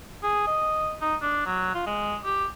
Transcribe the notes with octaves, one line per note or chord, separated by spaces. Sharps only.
G#4
D#5
D#4
D4
F#3
F4
G#3
G4